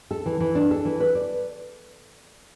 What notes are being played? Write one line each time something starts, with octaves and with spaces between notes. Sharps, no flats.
A4
E3
E3
D4
A4
E3
B4
D5